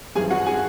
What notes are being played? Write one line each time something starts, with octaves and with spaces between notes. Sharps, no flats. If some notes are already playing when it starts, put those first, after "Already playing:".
G#1 F#2 E3 G#4 G#5
F#4 F#5
G#4 G#5